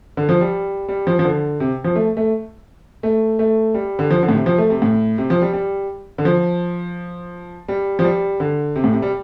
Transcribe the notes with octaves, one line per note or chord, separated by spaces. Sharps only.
D3
F3
G3
G3
F3
F3
D3
C3
F3
A3
A3
A3
A3
G3
D3
F3
D3
A2
C3
F3
A3
C3
A2
C3
F3
G3
G3
D3
F3
G3
F3
G3
D3
C3
A2
C3
G3